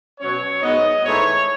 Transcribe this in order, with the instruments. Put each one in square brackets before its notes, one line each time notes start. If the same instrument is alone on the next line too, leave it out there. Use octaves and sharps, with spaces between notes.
[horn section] B2 F#3 C#4 C#5
G#2 F#3 B3 D#4 D#5
G#2 E3 A3 D#4 C#5